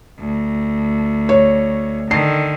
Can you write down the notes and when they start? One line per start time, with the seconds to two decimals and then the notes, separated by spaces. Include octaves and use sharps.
0.19 D2
1.29 C#5
2.11 D3 D#3 C7